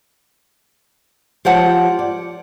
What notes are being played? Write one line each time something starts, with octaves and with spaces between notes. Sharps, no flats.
F3 G4 C#5 F#5 A5
D5